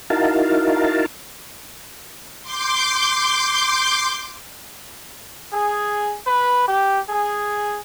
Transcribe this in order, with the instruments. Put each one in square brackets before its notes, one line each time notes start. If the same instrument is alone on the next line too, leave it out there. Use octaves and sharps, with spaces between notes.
[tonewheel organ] D#4 E4 F#4 A#4 F5 A5
[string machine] C6 D6 G6
[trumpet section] G#4
B4
G4
G#4